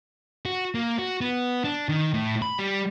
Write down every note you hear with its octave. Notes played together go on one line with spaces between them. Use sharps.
F#4
A#3
F#4
B3
D4
D#3
A2
B5
G3